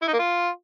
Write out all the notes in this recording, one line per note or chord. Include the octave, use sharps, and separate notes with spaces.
E4
D#4
A#3
F4